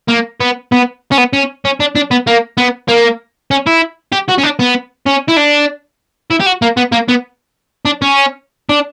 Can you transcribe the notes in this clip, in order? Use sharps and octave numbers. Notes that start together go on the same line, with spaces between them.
A#3
B3
B3
C#4
B3
C#4
C#4
D4
D4
B3
A#3
B3
A#3
C#4
E4
G4
F#4
C#4
D4
B3
C#4
E4
D4
E4
G4
F#4
A#3
B3
A#3
B3
D4
C#4
D4